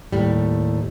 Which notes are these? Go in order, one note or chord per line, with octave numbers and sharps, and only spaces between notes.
D#2 A2 G3